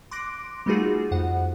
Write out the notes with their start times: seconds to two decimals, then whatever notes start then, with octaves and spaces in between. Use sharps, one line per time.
0.11 C6 D6 F#6 A#6 D7
0.66 G3 A3 D#4 F4 F#4 G#4
1.11 F2 F#5